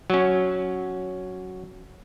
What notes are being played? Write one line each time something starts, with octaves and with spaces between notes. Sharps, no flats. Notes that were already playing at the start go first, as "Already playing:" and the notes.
F#3 C#4